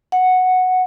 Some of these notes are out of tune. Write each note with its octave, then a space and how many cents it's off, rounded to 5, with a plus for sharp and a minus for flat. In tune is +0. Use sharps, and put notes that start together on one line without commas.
F#5 -5